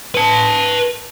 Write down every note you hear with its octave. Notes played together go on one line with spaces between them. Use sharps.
B4 A5